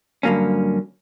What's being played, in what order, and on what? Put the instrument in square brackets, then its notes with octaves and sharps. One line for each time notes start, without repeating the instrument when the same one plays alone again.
[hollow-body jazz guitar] G2 D3 F#3 A#3 C#4